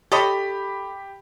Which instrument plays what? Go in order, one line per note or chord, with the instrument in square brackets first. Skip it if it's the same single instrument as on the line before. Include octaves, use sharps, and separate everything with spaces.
[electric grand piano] G4 B5 [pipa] A4 C#5 D#5